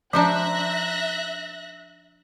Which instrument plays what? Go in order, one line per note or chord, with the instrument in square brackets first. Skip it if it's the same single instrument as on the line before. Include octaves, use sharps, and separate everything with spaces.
[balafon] F3 [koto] D4 D#4 C5 [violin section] E5 F#6 A#6